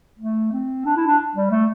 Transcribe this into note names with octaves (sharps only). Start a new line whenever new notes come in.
A3
C4
D4
E4
D4
G3
A3